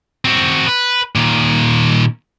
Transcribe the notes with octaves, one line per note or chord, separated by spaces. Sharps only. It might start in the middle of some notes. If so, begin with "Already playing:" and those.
C4 F#4
B4
A#2 D#3